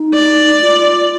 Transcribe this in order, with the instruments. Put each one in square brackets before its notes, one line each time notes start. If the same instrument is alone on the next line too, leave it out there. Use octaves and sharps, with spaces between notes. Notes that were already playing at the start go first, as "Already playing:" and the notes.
Already playing: [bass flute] D#4
[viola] D5
[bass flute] F4